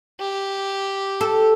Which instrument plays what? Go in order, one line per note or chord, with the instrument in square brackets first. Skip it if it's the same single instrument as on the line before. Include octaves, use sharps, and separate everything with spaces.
[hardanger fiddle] G4
[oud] A4